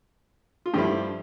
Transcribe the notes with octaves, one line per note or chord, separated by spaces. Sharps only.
F4
G2 F3 A3 E4 G4